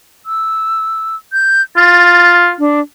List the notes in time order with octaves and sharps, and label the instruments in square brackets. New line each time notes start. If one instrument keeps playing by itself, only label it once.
[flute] E6
G6
[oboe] F4 [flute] A6
[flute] D4